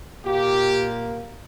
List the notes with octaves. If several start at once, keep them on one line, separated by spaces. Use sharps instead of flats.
A#2 A#3 F4 G4